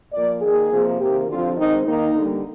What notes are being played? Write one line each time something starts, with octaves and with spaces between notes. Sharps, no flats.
A#2 F3 A#3 D5
D#3 A#3 G#4
C3 F3 A#3
C3 D#3 A#3 G4
D3 F3 C4 F4
D#3 G#3 C4 D#4
D#3 A#3 D#4
D3 G3 A#3